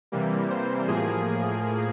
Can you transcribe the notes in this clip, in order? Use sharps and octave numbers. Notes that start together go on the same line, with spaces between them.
C3 E3 G3 A#3
C5
A2 F3 A#3 G#4